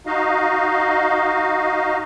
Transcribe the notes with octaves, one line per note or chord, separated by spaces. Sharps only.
D#4 F#4 D#5 F5